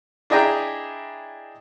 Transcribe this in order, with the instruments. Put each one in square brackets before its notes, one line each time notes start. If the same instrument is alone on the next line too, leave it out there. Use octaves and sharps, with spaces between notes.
[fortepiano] D4 E4 G#4 D#5 G5 A#5